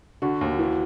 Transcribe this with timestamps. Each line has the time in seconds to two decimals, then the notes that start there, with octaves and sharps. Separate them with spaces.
0.22 D3 F#4
0.41 D#2
0.59 E3